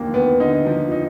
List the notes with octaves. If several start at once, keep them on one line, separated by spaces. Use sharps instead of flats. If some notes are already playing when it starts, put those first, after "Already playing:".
Already playing: D#2 D3 F3 A#3
D#2 B3
D3 D#4
F3
D#4